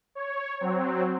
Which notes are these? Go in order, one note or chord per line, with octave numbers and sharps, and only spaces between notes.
C#5
F#3 C4